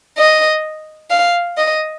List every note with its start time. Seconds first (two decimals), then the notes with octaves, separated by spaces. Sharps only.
0.18 D#5
1.10 F5
1.57 D#5